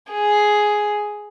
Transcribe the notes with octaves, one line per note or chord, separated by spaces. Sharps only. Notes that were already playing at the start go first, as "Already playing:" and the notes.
G#4